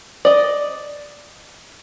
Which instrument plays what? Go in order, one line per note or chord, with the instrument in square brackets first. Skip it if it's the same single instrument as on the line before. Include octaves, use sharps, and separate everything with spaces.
[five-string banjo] D5 D#5